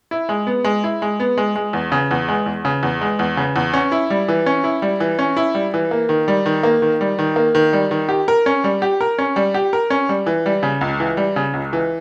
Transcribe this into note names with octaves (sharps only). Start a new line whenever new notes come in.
E4
G#3
B3
G#3
E4
G#3
B3
G#3
G#3
E2
C#3
E2
G#3
E2
C#3
E2
G#3
E2
C#3
E2
C#4
E4
G3
E3
C#4
E4
G3
E3
C#4
E4
G3
E3
A#3
D#3
G3
D#3
A#3
D#3
G3
D#3
A#3
D#3
G3
D#3
G4
A#4
C#4
G3
G4
A#4
C#4
G3
G4
A#4
C#4
G3
E3
G3
C#3
C#2
E3
G3
C#3
C#2
E3